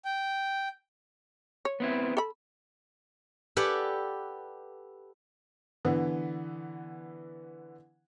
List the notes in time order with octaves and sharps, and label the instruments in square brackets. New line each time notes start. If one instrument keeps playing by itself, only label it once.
[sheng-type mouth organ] G5
[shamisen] C#5
[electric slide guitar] B3 C4 E4
[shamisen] A4 A5 B5
[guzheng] G4 A4 B4 D5 F#5 G#5
[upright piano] D3 E3 B3